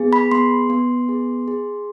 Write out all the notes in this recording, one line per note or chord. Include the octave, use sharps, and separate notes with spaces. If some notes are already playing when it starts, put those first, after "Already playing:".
Already playing: B3 G#4
B5
B3 C6
B3
G#4
G#4